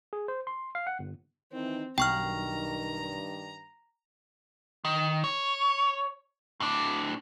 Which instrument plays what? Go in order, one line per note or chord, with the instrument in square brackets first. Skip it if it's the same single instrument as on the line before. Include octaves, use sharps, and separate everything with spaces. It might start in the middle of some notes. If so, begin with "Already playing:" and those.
[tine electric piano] G#4
C5
C6
F5
F#5
G1
[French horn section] D#3 E3 D#4 [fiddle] C4
[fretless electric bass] B1 [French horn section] G2 D#3 [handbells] G5 C#6 F6 [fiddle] A#5
[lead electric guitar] D#3
C#5
A2 D4